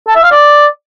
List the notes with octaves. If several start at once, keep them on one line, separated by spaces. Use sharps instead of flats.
A4
E5
F5
D5